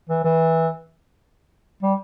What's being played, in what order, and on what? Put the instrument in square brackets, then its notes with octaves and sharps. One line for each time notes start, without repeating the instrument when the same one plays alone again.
[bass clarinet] E3
E3
G3